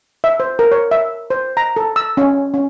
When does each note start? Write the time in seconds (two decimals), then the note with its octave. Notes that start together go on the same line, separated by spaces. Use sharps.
0.24 E5
0.40 C5
0.59 A#4
0.72 C#5
0.91 E5
1.30 C5
1.57 A#5
1.76 A4
1.96 E6
2.17 C#4
2.54 C#4